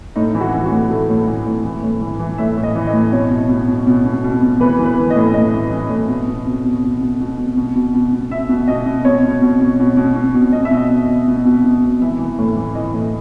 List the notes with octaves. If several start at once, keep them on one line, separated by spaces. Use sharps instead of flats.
A2 D#4
E3 E4
F#4
E3
F#4
A2
E3 A4
A2
E3
A2
E3
A2
E3
E3
A2 E5
A2
D#5
E3
D#5
A2
B2 C#5
B2
B2
B2
B2
B2
B2
B2
E3 B4
E3
B4
E3
D#5
A2
A2 D#5
E3
E3
A2
B2
B2
B2
B2
B2
B2
B2
B2
B2
B2
B2
B2
B2 E5
B2
B2 D#5
B2
B2 C#5
B2
B2
B2
B2
B2
B2
B2
B2 D#5
E5
B2
D#5
B2
B2
B2
B2
B2
B2
E3 E5
E3
A2
E3
E3 D#5
A2